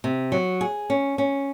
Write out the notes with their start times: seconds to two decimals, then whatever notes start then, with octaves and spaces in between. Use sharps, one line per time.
0.04 C3
0.32 F#3
0.61 G#4
0.90 C#4
1.18 C#4